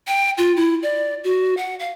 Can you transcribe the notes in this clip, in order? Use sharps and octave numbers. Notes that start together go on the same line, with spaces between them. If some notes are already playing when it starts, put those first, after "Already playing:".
G5
F4
E4
D5
F#4
F#5
F5